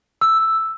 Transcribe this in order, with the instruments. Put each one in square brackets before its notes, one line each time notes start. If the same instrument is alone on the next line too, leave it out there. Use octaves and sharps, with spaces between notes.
[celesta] E6